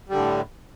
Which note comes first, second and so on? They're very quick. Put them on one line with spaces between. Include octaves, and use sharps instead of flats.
G3 D3 A2